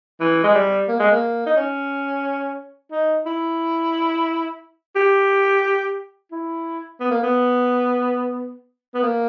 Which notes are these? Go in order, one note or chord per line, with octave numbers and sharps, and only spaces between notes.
E3
G#3
G3
A#3
G#3
A#3
D#4
C#4
D#4
E4
G4
E4
B3
A#3
B3
B3
A#3